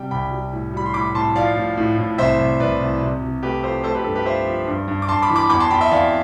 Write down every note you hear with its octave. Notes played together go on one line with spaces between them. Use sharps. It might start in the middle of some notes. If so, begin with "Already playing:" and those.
Already playing: C3 G3 G5
C2 G5 B5
G3
A2
G3 B5
C6
A2 B5 D6
A2 A5 C6
F3 D5 F5
A2
A2
A2
C2 C5 E5
C2
C2 B4 D5
C2
C3
C3
A3 G4 B4
F3 A4 C5
A3 A4 C5
G4 B4
G2 A4
G4 B4
F3 C5 E5
F3
G2
G2
D6
G2 A5 C6
B5 D6
E3
B5 D6
E2 B5 D6
A5 C6
E2 G5 B5
E5 G5
E2 D5 F5